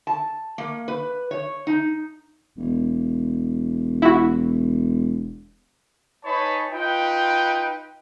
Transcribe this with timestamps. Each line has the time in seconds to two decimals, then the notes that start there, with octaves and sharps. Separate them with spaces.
0.07 A5
0.58 A#3
0.88 B4
1.31 C#5
1.67 D#4
2.58 E1
4.02 E4 F#4
6.24 D#4 B4 C#5 G#5 A5 B5
6.70 D#4 F4 B4 G5